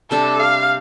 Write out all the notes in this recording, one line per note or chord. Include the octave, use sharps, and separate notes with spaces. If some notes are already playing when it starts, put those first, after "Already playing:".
C3 G3 D4 A4
F5